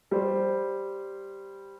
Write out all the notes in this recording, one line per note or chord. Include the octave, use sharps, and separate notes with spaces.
G3 C5